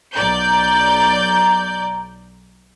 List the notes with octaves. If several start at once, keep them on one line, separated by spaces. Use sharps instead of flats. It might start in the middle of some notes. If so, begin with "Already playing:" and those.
B1 D5 A#5 G6